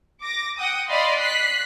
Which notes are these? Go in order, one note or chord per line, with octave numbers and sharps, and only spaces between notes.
D6 A#6
F#5 G5 D#6
D5 D#5 F5 B5 C6
F#6 B6 C7